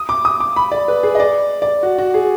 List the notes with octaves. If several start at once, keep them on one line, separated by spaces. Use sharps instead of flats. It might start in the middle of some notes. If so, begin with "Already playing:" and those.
Already playing: D#6
D6
D#6
D6
B5
D5
B4
G#4
D#5
D5
D5
F#4
F#4
G#4